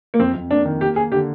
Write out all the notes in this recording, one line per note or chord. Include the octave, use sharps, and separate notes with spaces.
A#3
F2 C4
F2
A#3 D4
D#3
A#3 G4
A#3 G#4
D3 G4